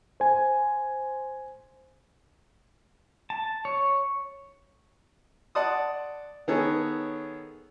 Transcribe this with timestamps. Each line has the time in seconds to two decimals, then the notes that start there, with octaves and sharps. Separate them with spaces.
0.20 C5 G#5
3.30 A5
3.65 C#5
5.55 D5 F#5 A5 C6 D#6
6.48 D#3 B3 D#4 G#4 A4 C#5